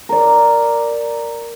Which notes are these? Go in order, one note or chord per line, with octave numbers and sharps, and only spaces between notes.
A#4 D5